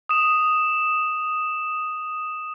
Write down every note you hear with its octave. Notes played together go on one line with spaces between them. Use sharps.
D#6 E7